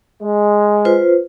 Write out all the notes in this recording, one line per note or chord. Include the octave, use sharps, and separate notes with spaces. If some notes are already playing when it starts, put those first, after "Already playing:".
G#3
F4 B4 C5